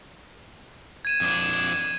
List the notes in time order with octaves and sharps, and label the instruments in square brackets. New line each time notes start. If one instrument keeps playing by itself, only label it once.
[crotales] G#6 D#7 E7
[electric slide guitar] F2 D4